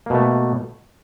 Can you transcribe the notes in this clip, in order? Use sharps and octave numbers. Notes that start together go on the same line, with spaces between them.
B2 A3 A#3